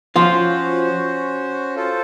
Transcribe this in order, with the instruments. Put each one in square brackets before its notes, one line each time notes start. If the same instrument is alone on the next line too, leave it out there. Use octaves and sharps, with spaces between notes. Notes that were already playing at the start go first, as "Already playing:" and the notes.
[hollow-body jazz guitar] F3 F4 [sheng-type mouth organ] C#4 F#4 C5
[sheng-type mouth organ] F4 A4 C5